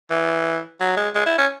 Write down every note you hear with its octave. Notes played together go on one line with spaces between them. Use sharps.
E3
F#3
G#3
G#3
E4
C#4